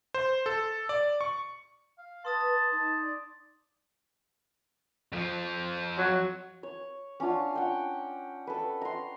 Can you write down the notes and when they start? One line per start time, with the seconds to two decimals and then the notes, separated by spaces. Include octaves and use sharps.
0.14 C5
0.46 A4
0.89 D5
1.21 C#6
1.98 F5
2.25 B4 A5 C6 D#6 A6
2.41 A6
2.71 D#4 A5
3.03 D5
5.12 F2 F3
5.98 F#3
6.63 C#5
7.20 C#4 D4 F4 F#5
7.56 F#5 G5
8.47 A4 B4
8.81 A#5 C6